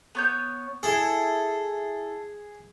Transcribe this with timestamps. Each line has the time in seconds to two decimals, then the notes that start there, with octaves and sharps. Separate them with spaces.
0.15 B3 C#5 G6
0.83 E4 G#4 A4